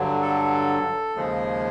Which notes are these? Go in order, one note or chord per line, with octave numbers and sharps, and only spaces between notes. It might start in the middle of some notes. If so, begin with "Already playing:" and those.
Already playing: G2 D3 F#3
A4
D#2 C#3 F3 G#3 G#4